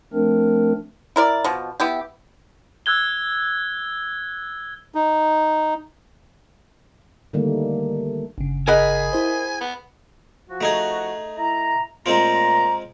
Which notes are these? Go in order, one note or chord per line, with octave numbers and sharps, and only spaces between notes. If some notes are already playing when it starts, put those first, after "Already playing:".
F3 A3 C4 D4 A#4
E4 A#4 D5
B2 F3
B3 E4 G4
E6 F#6 G#6 G7
D#4
D3 D#3 G3 A3 A#3
G1 C#3
G#4 A#4 D#5 F#5 G#5 B5
E4 C5
B3
F3 F#4
A3 D#4 G#4
E4 A#5
A#2 G#3 A3 C4 F4 A#5